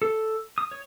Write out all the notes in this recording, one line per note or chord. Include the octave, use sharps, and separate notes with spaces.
A4
D#6
C#5